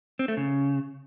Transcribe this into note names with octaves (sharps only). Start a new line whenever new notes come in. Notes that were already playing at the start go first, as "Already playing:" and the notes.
C4
A3
C#3